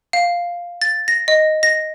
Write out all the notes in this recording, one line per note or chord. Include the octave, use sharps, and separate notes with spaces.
F5
A6
A#6
D#5
A#6